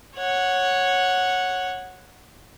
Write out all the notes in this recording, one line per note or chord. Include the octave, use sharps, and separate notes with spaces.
C#5 F#5